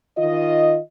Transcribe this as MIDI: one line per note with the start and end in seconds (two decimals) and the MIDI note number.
0.18 0.79 51
0.18 0.79 65
0.18 0.79 75